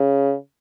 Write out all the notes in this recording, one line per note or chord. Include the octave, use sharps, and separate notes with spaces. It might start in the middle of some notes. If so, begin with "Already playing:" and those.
Already playing: C#3